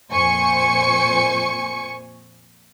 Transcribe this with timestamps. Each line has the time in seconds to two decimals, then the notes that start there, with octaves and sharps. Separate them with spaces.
0.11 F2 A#2 C5 G#5 C#6 C#7